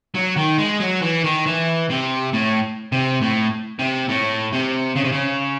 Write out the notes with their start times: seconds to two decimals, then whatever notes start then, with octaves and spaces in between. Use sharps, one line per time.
0.15 F#3
0.37 D#3
0.58 G#3
0.80 F#3
1.02 E3
1.24 D#3
1.46 E3
1.90 C3
2.33 A2
2.92 C3
3.21 A2
3.79 C3
4.09 A2
4.53 C3
4.96 C#3
5.04 C3
5.12 C#3